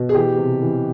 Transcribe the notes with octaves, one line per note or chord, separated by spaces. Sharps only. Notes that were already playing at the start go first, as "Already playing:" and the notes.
Already playing: B2
G#4
E3 G4
C3
E3